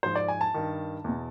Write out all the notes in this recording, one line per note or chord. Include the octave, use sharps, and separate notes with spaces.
G#2 F3 C5
D5
G#5
A5
G2 D#3
E2 B2